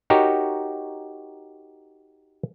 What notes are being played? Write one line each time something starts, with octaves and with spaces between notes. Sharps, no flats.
D#4 F#4 G4 A#4 C#5